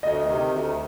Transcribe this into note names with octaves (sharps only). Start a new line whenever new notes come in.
D2 D#5
C3 D#3
D2